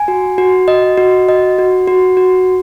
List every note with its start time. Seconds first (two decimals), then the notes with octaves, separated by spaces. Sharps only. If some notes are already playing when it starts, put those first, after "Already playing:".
Already playing: G#5
0.08 F#4
0.38 F#4
0.68 D#5
0.98 F#4
1.29 D#5
1.58 F#4
1.88 F#4
2.17 F#4